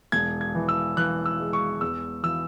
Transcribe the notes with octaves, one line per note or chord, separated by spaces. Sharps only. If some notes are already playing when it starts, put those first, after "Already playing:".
E1 G#6
G#6
E3
E6
E3 F#6
E6
G#3
C#6
E2 E6
E3 E6